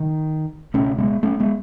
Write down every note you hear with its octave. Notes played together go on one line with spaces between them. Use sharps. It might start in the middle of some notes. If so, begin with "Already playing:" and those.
Already playing: D#3
C#2 B2 A3 C#4
G#3 B3
A3 C#4
G#3 B3